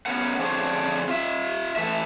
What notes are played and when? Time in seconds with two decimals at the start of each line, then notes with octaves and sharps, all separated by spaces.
0.06 B3 C#4 A#4 F#5
0.39 D3 F3 C4 D4 G#4 C#5
1.09 F4 E5
1.76 E3 A3 E5